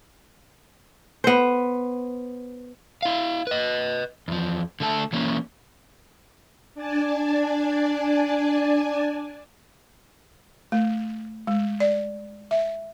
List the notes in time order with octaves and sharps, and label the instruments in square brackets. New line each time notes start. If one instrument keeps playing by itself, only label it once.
[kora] B3 C5
[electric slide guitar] E4 F5
B4 D#5
E2 F3
D3 A3 A5
E3 A#3 C#4
[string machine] D4 D5 G#5 A5
[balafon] A3
G#3
D5
E5